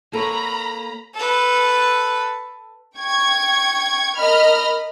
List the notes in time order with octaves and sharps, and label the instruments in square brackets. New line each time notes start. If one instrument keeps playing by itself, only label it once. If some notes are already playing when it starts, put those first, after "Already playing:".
[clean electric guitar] A#3 B4 C#5 [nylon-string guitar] A4 [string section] A#5 B5
[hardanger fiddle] A4 B4
[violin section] G5 C#6 G#6
A#4 D#5 B5 F6